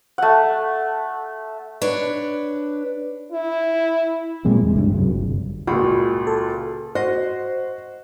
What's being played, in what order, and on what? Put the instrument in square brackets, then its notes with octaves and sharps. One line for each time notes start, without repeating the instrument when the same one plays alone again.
[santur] A3 F#5
[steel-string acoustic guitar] D4 B4 C#5
[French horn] E4
[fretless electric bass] A#2 G3 G#3 C4
E2 G#3
C#2 G2
C2 F#2 C#3
G1
[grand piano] C#2 A#2 [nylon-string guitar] F#4
[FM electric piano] A4
[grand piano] F#4 [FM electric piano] C5 [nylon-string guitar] D#5